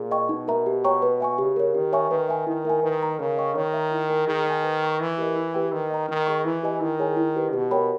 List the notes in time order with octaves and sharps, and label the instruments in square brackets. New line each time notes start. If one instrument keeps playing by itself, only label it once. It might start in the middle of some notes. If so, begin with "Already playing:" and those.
Already playing: [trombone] A#2 [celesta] G#4
[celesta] D#5 G5 C#6
[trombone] B2 [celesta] D#4
[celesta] A#4 E5 A#5
G4
C#5 G5 A#5 C#6
B4
E5 G#5 C#6
[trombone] C#3 [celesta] G4
[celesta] A#4 C#5
[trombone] D#3 [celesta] G4
[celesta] C#5 E5 G#5 C#6
[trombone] D#3 [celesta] B4
[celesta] E5 G#5
[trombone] D#3 [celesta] E4
[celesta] A#4 E5 G#5
[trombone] D#3 [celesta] B4
[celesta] D#5 A#5
[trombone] C#3 [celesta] A#4
[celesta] D#5 G5 C#6
[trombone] D#3 [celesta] C#5
[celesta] E5 A#5
E4
A#4 D#5 G#5
[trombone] D#3 [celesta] G#4
[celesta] D#5 G#5
B4
G5 C#6
[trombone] E3 [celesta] D#4
[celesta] G4 A#4 D#5
E4
G4 B4 G5
[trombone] D#3 [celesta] B4
[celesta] D#5 A#5
[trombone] D#3 [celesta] D#4
[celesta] G#4 D#5 A#5 C#6
[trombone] E3 [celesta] E4
[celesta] G4 B4 D#5 G#5
[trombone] D#3 [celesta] E4
[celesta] G#4 C#5 G#5
E4
G4 B4
[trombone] B2 [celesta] G4
[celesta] A#4 C#5 G5 B5